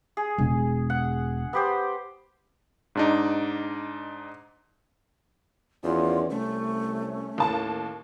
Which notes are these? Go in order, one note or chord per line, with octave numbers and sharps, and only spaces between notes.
G#4
E1
F#5
B3 G4 C5
G#2 D4 D#4
E2 D#3 C#4 F4 D5
C2 A3 C#4
D#2 A2 A5